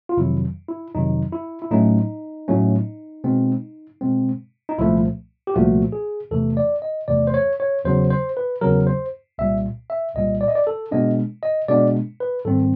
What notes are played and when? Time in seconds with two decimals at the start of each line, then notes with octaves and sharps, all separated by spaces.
0.09 F4
0.17 F2 C3 D#3 F#3 E4
0.69 E4
0.95 F2 C3 D#3 F#3 D#4
1.32 E4
1.62 E4
1.71 A2 F#3 A3 C#4 D#4
2.48 A2 F#3 A3 C#4
3.24 B2 G#3 C4
4.01 B2 G#3 C4
4.69 D#4
4.79 C2 A#2 F3 A3 E4
5.47 G4
5.54 C2 A#2 F3 A3 F#4
5.92 G#4
6.31 E2 C3 E3 A3 A4
6.57 D5
6.82 D#5
7.08 E2 C3 E3 A3 D5
7.27 C5
7.34 C#5
7.60 C#5
7.85 E2 C#3 F#3 C5
8.10 C5
8.37 B4
8.61 E2 C#3 F#3 A#4
8.87 C5
9.38 C2 A#2 G3 E5
9.90 E5
10.15 C2 A#2 G3 D#5
10.41 D5
10.48 D#5
10.55 D5
10.67 A4
10.91 B2 G#3 B3 D4 D#5
11.43 D#5
11.68 B2 G#3 B3 D4 D5
12.20 B4
12.45 G#2 D#3 G3 C4 A4